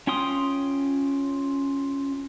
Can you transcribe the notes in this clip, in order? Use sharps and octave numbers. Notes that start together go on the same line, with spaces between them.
C#4 F4 G5 C6 D#6